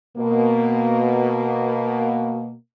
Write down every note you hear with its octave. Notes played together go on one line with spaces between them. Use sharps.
B2 A#3